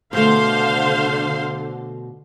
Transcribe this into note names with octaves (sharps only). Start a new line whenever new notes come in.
B2 D3 A3 C5 F5 C6